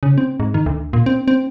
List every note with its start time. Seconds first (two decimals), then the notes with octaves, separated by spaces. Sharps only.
0.03 C#3
0.18 C4
0.40 G#2
0.54 D#3
0.66 D2
0.93 A#2
1.06 C4
1.28 C4